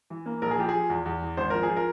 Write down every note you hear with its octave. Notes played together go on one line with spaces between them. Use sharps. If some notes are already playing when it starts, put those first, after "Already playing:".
E3
A#3
A#1 A#4
G#4
F3 G4
G#4
F3
E2
E2
E3
G#1 C5
F3 A#4
G#4
F3
A#4